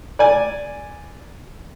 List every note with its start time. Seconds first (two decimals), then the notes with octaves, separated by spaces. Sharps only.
0.19 D5 G#5